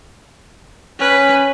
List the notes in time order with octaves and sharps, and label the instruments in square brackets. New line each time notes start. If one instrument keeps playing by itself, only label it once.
[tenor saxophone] C#4 [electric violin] B4